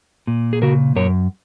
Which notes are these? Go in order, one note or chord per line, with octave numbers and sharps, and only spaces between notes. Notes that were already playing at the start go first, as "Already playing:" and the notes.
A#2
G#4
C#3 F#4 A#4
F#2 A#4 C#5